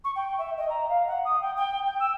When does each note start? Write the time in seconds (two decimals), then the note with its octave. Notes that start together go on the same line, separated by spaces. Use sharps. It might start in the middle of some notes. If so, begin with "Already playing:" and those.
0.04 C#6
0.16 G5
0.38 E5
0.57 D#5
0.70 A#5
0.89 F5
1.07 F#5
1.25 D#6
1.41 G5
1.57 G5
1.86 G5
2.00 E6